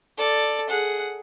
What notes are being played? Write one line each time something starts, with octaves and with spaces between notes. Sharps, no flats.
A4 D5
G#4 F#5